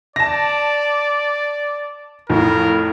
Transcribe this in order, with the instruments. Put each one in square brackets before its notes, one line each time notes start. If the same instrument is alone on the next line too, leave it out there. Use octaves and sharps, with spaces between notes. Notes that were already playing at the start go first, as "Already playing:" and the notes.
[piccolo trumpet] D5 [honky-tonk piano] A5 A#6
[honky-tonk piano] F2 A2 [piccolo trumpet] A#4